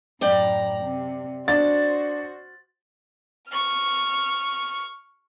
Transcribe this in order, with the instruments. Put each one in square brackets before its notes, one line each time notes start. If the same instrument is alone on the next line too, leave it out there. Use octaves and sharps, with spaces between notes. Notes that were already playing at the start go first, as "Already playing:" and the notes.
[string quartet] F#2 A2 A#5 [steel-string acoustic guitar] D5 G5
[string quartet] C3
[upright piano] D4 A6 [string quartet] F#4 C5
[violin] C#6 F6